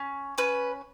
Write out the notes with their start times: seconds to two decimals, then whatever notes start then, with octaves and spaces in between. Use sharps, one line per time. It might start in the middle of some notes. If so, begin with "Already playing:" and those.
Already playing: C#4
0.38 C#4 B4